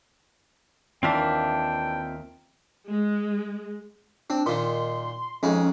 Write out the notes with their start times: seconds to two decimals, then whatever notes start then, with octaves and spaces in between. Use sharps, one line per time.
1.03 D#2 E3 C4 D4 F4 E5 G5 A5
2.90 G#3
4.30 C4 D4
4.46 A#2 D#3 C6
5.43 F2 G#3 C#4 D#4